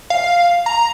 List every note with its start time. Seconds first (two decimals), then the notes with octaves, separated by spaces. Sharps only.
0.10 F5
0.66 A#5